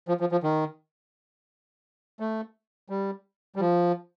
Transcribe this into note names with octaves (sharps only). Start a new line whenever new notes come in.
F3
F3
F3
D#3
A3
G3
G3
F3